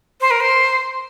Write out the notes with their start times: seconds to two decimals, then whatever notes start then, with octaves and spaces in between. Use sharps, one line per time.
0.21 C5
0.31 A#4
0.40 C5